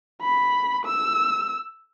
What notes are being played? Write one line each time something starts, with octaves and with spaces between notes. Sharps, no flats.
B5
E6